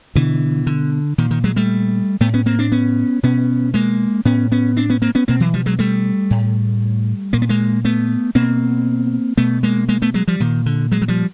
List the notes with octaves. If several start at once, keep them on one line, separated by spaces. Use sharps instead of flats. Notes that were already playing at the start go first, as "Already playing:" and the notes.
B2 D3 E3
D3
A#2 D#3
D#3
F#3 G#3
G3 A3
A2 A3 B3
B3 C#4
A#3 C4
C4 D4
B3 C#4
B2 B3 C#4
G#3 A#3
A2 B3 C#4
B3 C#4
C4 D4
B3 C#4
A#3 C4
B3 C#4
B2 A#3 C4
E3 F#3
F3 G3
F#3 G#3
G3 A3
A2
A#2 A#3
B3
G#3 A#3
A3 B3
B2 A#3 C4
B2 A3 B3
G#3 A#3
G#3 A#3
A3 B3
F#3 G#3
F3 G3
A#2 D#3
D3
F#3 G#3
F#3
F3 G3